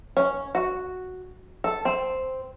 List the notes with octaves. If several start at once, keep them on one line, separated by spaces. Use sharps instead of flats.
C#4
F#4
A4
C4